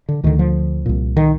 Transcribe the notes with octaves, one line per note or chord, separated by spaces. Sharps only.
D3
D2 D3 D#3
F3
C2 A#2
D#3